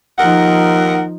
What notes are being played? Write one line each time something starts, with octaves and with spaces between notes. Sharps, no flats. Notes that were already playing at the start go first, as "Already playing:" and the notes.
D#2 F3 D#4 A#4 F#5